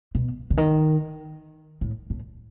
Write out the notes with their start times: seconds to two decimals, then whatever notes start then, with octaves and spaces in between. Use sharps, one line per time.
0.15 B2
0.50 D3
0.57 D#3
1.81 A2
2.10 A2